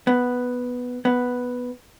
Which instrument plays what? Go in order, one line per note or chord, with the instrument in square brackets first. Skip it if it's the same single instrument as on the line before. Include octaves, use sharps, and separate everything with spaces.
[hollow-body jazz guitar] B3
B3